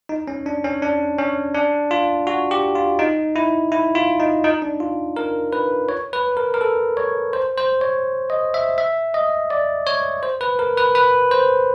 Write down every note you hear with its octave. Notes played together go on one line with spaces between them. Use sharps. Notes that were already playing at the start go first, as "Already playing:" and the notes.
D#4
C#4
D4
C#4
D4
C#4
D4
F4
F#4
G4
F4
D#4
E4
E4
F4
D#4
D#4
D4
F4
A#4
B4
C#5
B4
A#4
A#4
A4
C#5
C5
C5
C#5
D#5
E5
E5
D#5
D5
C#5
C5
B4
A#4
B4
B4
C5